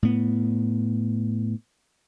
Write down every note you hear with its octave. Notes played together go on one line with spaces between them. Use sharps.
A2 B3